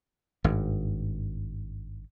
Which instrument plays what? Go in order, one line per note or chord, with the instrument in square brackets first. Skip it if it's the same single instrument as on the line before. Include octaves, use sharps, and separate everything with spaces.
[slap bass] G#1 G2